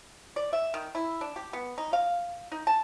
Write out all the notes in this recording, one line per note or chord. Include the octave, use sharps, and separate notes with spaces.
D5
E5
D#3
E4
D4
G4
B3
D#4
F5
D#4
A5